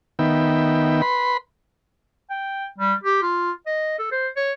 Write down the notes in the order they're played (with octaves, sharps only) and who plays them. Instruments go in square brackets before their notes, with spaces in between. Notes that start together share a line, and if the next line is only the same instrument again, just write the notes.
[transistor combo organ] D#3 B3 E5 G5
B4 B5 C6
[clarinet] G5
G3
G4
F4
D#5
A4
C5
C#5